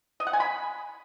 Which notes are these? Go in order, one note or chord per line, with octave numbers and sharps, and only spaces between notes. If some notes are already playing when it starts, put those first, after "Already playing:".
D#5
F#5
G#5
B5